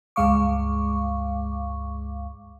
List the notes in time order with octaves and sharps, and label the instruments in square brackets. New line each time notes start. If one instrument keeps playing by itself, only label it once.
[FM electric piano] C#2 G2 G#3 F5 C#6 D6